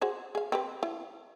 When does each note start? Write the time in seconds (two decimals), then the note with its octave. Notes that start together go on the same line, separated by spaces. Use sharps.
0.01 F#4 G#4 C5
0.35 G#4 F5
0.52 C4 G4 B4
0.83 E4